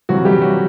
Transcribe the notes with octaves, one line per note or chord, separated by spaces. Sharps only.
C3 E3 F#3 G3 F#4
G3 G4
F#3 F#4